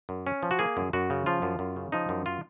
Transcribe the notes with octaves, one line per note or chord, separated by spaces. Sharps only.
F#2
C#4
F3
F#4
A#3 G#4
F#2
F#2 F#4
C#3
F3 F4
F#2
F#2
C#3
F3 D#4
F#2
F4